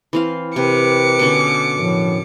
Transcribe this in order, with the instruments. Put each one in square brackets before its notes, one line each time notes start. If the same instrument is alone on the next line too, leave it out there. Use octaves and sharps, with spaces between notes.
[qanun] E3 C4 F5
[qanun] C3 [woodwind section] G4 A#4 B4 [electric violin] D6 C#7
[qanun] B2 D3 C#4
[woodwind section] F#2 A2 F3